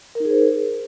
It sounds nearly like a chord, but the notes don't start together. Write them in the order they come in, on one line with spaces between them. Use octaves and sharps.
A#4 D#4 G#4 C5